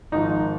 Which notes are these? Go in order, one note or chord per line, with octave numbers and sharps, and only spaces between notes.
G#1 G#2 F3 D#4